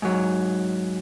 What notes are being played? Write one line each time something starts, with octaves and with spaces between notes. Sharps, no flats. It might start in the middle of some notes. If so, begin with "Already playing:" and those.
G#2 F#3